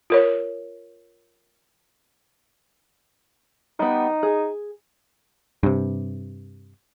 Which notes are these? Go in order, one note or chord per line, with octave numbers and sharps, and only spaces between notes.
F4 A#4 C#5
G3 B3 D#4
G#4
G2 C3